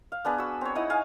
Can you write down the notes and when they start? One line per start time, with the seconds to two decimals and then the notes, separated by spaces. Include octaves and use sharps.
0.12 F5
0.25 B3 D4 G#4 B4
0.38 F#4 E6
0.61 C4 C#5
0.75 D#4 E4 F#5 D#6
0.90 G#4 F5 G#5